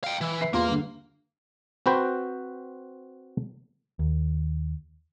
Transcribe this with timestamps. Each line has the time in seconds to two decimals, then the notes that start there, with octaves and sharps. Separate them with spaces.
0.04 F5 G5
0.21 E3
0.41 B4 E5 C7
0.53 E2 A#3 F4 C6
0.69 G2 D3
1.86 C4 F#4 B4 C5 G5
3.99 D#2